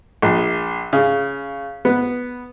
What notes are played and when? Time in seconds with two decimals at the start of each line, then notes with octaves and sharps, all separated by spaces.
0.22 A#1
0.93 C#3
1.85 B3